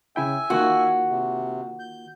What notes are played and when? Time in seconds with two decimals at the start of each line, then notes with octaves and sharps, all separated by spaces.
0.16 C#3 E4 E5 G5 G#5
0.50 D#3 A#3 F4 F#4
1.10 C3
1.79 G6